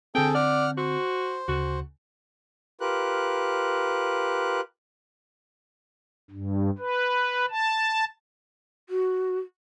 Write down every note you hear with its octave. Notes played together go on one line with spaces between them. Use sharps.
D3 C4 G#4 A4 G5
D5 F#5 F6
F#4 C5
D2 C#3 F#4
F4 G4 A#4 B4 F#6
G2
B4
A5
F#4